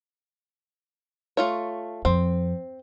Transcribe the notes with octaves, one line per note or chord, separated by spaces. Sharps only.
A3 F4 C#5
F2 C4